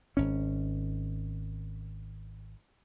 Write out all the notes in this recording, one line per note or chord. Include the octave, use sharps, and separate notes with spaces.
G#1 C#4